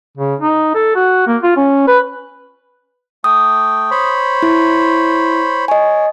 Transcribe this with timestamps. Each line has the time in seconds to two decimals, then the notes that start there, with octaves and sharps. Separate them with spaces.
0.17 C#3
0.41 D#4
0.75 A4
0.96 F#4
1.27 A#3
1.43 F4
1.57 C#4
1.87 B4
3.24 A3 G5 D#6
3.91 C5 C#5 B5
4.43 E4
5.68 C#5 D#5 G#5